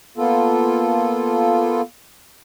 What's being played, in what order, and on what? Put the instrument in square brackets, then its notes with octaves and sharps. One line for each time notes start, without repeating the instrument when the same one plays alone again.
[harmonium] A#3 B3 F4 A4